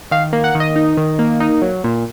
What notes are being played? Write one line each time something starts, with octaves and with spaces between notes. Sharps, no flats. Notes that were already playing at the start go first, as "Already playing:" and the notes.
D#3 F5
A#3
F#5
D#3
D#5
D#4
D#3
A#3
D#4
F#3
A#2